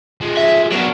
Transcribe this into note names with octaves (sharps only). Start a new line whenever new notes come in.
F3 G#3
E5
F#3 B3 D4 A#4